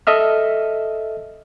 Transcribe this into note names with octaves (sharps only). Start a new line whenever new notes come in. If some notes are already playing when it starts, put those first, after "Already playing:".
A4 D#5 E5 F6